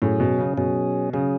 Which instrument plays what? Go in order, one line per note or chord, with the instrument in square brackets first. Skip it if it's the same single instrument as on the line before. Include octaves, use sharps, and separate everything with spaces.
[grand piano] A2 [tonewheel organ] F#3 C#4 G#4
[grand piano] B2
C#3
[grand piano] B2 [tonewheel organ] F#3 C#4 G#4
[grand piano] C#3 [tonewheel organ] F#3 C#4 G#4